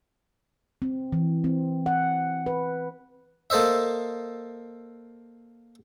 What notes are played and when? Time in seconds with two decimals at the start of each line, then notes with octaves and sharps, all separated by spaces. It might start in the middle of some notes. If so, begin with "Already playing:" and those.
0.82 C4
1.13 E3
1.44 C4
1.86 F#5
2.46 B4
3.50 A#3 A4 C5 D#5 E5